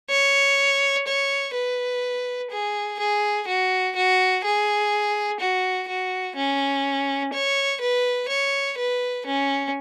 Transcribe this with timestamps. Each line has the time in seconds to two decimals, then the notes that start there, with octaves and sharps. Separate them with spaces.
0.10 C#5
1.07 C#5
1.55 B4
2.51 G#4
2.99 G#4
3.48 F#4
3.96 F#4
4.44 G#4
5.40 F#4
5.89 F#4
6.36 C#4
7.33 C#5
7.81 B4
8.29 C#5
8.78 B4
9.26 C#4